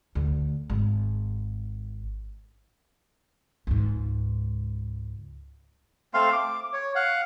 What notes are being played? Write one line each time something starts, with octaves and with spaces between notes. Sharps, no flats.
D2
G#1
C#2 G#2
A3 C4 F5 C6
D6
C#5
F5 F#5